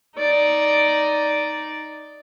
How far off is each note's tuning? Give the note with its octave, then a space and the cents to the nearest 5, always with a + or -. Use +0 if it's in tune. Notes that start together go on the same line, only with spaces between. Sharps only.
D#4 +0 D5 -5